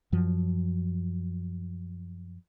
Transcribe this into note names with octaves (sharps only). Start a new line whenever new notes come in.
F#2 F3 F#3